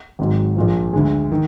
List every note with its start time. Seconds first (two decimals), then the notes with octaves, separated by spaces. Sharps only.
0.19 G#1 G#2 F#3
0.56 A#1 A#2 F3
0.93 D2 D3 G#3
1.32 D#3